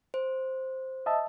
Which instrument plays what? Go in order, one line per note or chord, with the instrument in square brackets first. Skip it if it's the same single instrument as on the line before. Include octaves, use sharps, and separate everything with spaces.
[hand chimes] C5
[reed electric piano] D#5 E5 A5